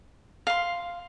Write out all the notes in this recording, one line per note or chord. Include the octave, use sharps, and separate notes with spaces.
F5 C6